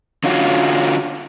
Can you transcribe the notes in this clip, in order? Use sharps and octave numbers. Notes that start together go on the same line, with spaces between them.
D3 C#4 F4 F#4